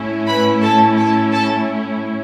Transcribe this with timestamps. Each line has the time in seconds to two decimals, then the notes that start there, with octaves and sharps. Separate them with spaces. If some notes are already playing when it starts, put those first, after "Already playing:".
Already playing: A2 A3 C#4 E4
0.27 B4 B5
0.61 A4 A5
0.96 A4 A5
1.32 A4 A5